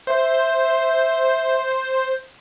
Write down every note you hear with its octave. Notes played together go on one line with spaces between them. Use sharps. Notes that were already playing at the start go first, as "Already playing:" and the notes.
C5 E5